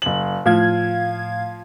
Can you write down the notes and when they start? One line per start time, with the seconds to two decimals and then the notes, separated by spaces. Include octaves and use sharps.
0.02 F#1 F#7
0.46 A2 F3 F5 G#6